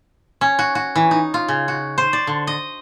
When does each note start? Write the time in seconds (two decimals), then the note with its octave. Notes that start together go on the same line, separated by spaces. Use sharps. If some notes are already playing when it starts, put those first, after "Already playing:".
0.41 C#4
0.59 F#4
0.75 F#4
0.96 E3
1.11 D#4
1.34 F4
1.48 C#3
1.68 F#4
1.98 C5
2.13 D5
2.27 D3
2.47 D#5